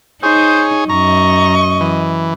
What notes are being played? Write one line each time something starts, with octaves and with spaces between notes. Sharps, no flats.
D#4 G#4 C5 C#5
F#2 D#5 A#5 C#6
E3